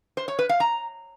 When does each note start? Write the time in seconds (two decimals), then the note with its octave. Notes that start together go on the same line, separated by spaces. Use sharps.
0.17 C5
0.28 C#5
0.39 B4
0.49 F5
0.60 A#5